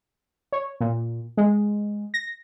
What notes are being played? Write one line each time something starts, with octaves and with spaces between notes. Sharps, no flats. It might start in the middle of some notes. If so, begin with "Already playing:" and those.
C#5
A#2
G#3
A#6